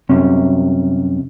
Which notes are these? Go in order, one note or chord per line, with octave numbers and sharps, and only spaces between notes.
C2 F#2 C3 C#4